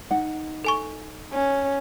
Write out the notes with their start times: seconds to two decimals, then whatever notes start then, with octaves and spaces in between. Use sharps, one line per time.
0.11 D#4 F#5
0.65 A4 G#5 C#6
1.33 C#4